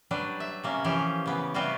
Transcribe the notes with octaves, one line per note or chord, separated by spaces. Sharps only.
F#3 G3 D4 B4
E5
C3 A#3 C#4
E3 F3 C#4 G4
C#3 B3
C3 G3 F4 F#4 B4